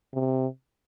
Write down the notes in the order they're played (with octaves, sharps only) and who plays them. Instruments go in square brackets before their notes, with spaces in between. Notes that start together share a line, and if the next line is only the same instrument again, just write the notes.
[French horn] C3